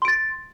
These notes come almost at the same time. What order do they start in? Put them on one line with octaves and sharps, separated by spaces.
C6 D7 A6